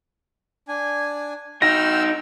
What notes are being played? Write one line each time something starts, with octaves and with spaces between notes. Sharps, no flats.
D4 G#5
D#4 F#4 G5 E6 F6 A#6